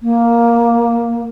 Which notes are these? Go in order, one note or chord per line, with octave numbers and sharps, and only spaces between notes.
A#3